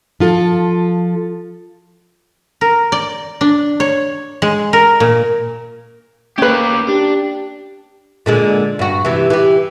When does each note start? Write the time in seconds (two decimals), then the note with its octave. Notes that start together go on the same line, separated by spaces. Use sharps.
0.20 F3 F4 A4
2.61 A#4
2.92 D5
3.41 D4
3.80 C#5
4.42 G#3
4.73 A#4
5.00 A#2
6.38 A#3 C#4 G4 B4
6.88 D4 G4
8.26 A#2 D3 G#3
8.79 G2 F#4
9.05 C3 E3
9.30 E3 G4